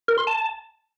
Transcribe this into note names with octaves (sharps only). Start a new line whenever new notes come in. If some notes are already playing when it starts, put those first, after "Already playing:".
A#4
C6
A5